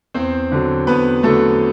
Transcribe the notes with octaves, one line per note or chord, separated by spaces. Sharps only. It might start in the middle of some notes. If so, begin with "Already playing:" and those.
E2 C4 C5
D3 F#3
E2 B3 B4
D3 F#3 A3 A4